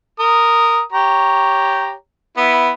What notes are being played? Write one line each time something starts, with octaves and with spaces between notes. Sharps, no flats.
A#4 D#6
G4 C#5 A#5
B3 E4